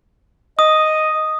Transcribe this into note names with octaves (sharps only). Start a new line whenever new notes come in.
D#5 D#6